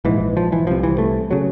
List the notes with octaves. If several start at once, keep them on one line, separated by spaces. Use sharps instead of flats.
A#1 G#2 E3
F3
E3
C2 C3 F3
E3
A3
C#3 F#3